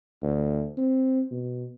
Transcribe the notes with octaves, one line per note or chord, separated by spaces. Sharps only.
D2
C4
B2